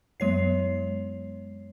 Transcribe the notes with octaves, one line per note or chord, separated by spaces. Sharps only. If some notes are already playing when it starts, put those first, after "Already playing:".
F#2 F#3 G#3 B3 C#5 C7